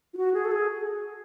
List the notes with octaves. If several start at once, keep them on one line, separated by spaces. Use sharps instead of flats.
F4
F#4
G#4
A4
G#4